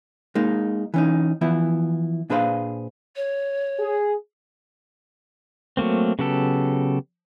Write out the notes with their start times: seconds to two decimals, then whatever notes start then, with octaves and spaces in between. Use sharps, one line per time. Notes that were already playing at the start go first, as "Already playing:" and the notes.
0.35 G#3 A#3 D#4
0.94 E3 C#4 D#4
1.41 E3 F3 B3 E4
2.30 A#2 D4 G#4 B4 C5 F5
3.16 C#5
3.79 G#4
5.77 F#3 A3 A#3 C4
6.19 C#3 F#3 B3 G4 A4